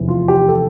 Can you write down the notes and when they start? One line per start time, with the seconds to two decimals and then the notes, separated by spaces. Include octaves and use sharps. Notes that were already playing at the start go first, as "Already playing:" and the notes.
Already playing: F1 E2 E3
0.08 F4
0.28 G4
0.48 A4